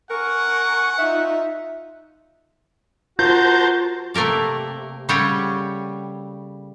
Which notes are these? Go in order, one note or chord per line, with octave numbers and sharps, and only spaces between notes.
A#4 F#5 G#5 C#6
D#4 F4 E5
F4 F#4 A#4 C5 A5 G6
C3 A3 A#3 A#4 D5
C#3 G3 C4 C#5 F#5 G5